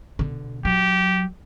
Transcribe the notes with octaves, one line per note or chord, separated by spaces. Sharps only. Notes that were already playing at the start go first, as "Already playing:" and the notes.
B2 D3
F#3 G4